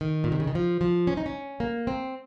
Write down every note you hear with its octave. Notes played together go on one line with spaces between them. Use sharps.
D#3
A#2
C3
C#3
D#3
F3
F3
C#4
D#4
C#4
A#3
C4